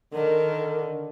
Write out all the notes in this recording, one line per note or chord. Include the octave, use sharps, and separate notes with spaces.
D3 D#3 A#4